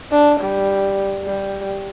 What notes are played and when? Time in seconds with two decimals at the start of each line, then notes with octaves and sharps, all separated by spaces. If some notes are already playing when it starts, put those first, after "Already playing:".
0.12 D4
0.40 G3
1.25 G3